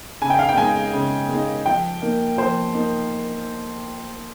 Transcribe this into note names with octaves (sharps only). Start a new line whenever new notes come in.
C#3 G#5
G5
F5
G5
G#3 D#4 G#5
C#3
G#3 D#4
F3 G5
A#3 D#4
F3 C5
A#3 D#4